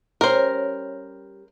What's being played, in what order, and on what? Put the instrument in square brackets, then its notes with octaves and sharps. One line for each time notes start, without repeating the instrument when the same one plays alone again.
[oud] G3 C#4 [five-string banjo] A#4 C5